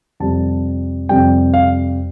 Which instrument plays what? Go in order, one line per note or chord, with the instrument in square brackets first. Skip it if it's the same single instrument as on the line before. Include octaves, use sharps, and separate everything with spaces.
[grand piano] F2 C3 G3 A5
F2 C3 G3 G5
F5